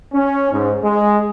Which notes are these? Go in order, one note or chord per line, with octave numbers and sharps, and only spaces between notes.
C#4
G#2
G#3